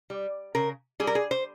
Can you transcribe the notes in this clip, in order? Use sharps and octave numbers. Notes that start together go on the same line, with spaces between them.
G3
C#3 A#4
G3 G#4
A#4
G#4
C5